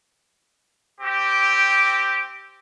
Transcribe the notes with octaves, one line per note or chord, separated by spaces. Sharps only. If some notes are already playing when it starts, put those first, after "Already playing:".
C4 G4